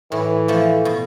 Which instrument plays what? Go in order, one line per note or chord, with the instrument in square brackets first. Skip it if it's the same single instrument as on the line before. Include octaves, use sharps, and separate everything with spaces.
[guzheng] A2 [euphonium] E3
[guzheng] F3 A3
B2